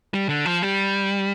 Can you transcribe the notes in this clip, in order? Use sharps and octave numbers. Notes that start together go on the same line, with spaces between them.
G3
D3
F3
G3